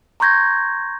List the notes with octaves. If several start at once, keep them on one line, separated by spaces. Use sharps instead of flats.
A#5 C6 C#6 G6 G#6 A#6